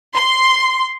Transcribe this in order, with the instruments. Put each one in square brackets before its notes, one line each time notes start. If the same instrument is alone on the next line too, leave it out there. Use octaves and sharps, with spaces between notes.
[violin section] C6